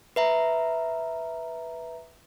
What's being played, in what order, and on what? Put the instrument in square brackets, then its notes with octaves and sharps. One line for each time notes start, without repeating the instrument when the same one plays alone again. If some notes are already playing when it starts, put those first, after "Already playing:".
[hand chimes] B4 E5 A#5